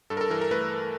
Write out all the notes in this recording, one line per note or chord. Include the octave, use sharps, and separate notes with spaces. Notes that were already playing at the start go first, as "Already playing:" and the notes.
G2 A4
A#4
A4
E3 A#4
A#4
A3 B4